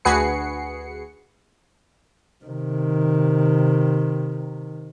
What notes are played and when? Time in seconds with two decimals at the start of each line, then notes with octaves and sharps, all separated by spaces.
0.05 D2 F#4 G#4 B4 C7 C#7
2.45 C3 D#3